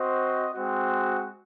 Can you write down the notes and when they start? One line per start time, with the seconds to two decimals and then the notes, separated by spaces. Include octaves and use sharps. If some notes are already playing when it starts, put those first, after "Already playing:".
Already playing: C4 F#4 C5 D#5
0.54 G#3 C4 F#4